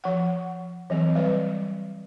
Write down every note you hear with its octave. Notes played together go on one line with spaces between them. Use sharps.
F3 F#5
E3 F#3 C4
G3 B4 D5